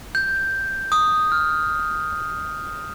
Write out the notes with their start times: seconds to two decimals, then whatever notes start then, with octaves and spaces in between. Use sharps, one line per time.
0.15 G6
0.92 D#6
1.32 F6